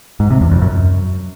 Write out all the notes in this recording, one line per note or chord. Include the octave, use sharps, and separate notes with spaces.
G#2
C3
E2
F2
F#2